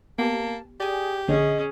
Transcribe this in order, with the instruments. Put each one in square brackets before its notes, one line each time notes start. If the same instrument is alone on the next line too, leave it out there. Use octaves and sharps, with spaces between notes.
[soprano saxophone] A#3 [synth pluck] B3 G4 G#5 [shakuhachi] A5
[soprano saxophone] G4 [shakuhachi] G#4 [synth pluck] D5 G#5
[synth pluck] A#1 D3 C#5 [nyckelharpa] C#4 G#4 [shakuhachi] D#5